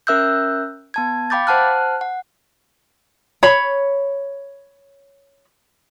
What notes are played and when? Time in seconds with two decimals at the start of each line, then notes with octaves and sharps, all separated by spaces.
0.07 C#4 A#4 E5 E6 F#6 G6
0.94 B3 A5 G#6
1.30 F5 G5 B5 D6 G6 A6
1.47 C5 F#5 A5 F6 F#6
2.01 F#5
3.43 C#5 B5